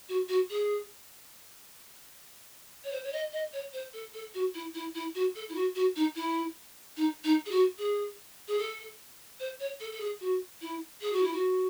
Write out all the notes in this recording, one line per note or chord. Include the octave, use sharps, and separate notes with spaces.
F#4
F#4
G#4
C#5
C5
C#5
D#5
D#5
C#5
C5
A4
A4
F#4
E4
E4
E4
F#4
A4
E4
F#4
F#4
D#4
E4
D#4
D#4
G#4
F#4
G#4
G#4
A4
C5
C#5
A4
A4
G#4
F#4
E4
G#4
F#4
E4
F#4